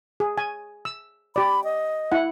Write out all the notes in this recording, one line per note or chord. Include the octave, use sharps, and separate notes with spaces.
G#4
G#5
E6
G4 D5 B5
D#5
E4 F#5